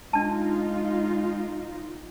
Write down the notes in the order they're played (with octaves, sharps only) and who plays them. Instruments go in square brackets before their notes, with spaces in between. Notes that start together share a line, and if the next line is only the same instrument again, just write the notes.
[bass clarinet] G#3 [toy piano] D4 A5 [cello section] D#4 F4